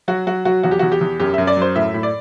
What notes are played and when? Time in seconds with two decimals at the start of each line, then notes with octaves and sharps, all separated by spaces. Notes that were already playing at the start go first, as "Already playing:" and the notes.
0.08 F#3 F#4
0.27 F#3 F#4
0.45 F#3 F#4
0.63 E2 F#4
0.71 G4
0.79 E2 F#4
0.92 G4
1.01 E2
1.20 F#2 G4
1.34 F#2 E5
1.47 D5
1.56 F#3
1.62 C5
1.76 A2 E5
1.94 A2
2.03 D5